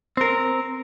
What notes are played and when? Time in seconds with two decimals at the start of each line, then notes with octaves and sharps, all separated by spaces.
0.17 C4 A#4